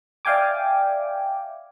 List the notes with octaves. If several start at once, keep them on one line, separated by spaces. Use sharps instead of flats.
D5 E5 F5 G5 G#5 D6